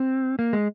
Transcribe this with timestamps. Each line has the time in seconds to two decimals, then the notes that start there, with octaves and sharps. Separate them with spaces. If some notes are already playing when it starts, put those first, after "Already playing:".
Already playing: C4
0.39 A#3
0.53 G#3